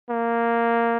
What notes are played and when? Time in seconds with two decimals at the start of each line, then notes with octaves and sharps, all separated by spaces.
0.10 A#3